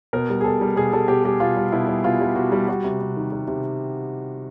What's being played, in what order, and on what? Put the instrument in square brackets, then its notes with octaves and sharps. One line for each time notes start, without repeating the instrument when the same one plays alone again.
[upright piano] B2 A#4
G3
G#4
B2 A4
G3
B2 G#4
G3 A4
B2 G4
G3 G4
B2 F4
G3
B2 E4
G3
B2 F4
G3
B2 F#4
G3
G3 F#4
C3
C3
D#3
G3
C3